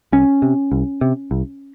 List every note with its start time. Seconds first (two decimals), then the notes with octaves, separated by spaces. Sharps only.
0.12 C2 C#4
0.42 C3
0.72 C2
1.01 C3
1.31 C2